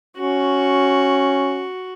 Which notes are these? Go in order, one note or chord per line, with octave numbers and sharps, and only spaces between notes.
C#4 F#4